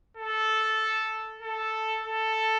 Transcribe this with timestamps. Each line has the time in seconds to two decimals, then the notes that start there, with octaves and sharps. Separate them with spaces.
0.17 A4
1.42 A4
2.03 A4